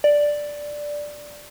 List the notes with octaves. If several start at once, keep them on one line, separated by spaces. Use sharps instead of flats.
D5